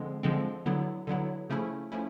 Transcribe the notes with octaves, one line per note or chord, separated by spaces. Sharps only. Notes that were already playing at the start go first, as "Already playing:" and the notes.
Already playing: D3 F3 G#3 C4
D3 F3 G#3 C4
D3 F#3 B3 E4
D3 F#3 B3 E4
C#3 F3 A3 C#4 E4
F3 A3 C#4 E4